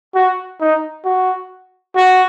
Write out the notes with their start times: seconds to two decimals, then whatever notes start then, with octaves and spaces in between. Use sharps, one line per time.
0.15 F#4
0.60 D#4
1.05 F#4
1.96 F#4